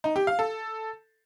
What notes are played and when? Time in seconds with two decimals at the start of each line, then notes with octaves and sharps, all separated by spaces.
0.04 D#4
0.16 G4
0.27 F5
0.39 A4